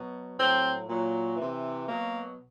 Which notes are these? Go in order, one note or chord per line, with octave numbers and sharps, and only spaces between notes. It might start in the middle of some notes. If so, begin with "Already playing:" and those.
Already playing: B2 F#3
A2 F#3 C4
A#2 F#3
C3 E3
B2 F#3 A#3